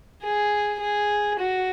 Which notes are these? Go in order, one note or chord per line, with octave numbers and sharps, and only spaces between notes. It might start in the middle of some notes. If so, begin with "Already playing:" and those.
G#4
G#4
F#4